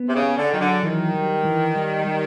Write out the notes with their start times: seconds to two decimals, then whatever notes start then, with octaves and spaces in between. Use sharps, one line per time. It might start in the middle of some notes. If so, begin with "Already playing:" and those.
Already playing: B3
0.08 C3
0.15 C#3
0.22 G#4
0.37 D3
0.53 D#3 F#3
0.61 D3
0.83 D#3 E3
1.15 G3
1.45 E3
1.75 G3
2.06 G3